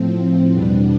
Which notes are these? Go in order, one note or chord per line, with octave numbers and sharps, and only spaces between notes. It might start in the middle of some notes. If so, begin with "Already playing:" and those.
Already playing: A2 F3 C4
E2 B2 G3 B3 D4